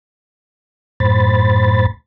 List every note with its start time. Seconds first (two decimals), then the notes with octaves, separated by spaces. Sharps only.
1.00 F#2 A2 C5 B5 A6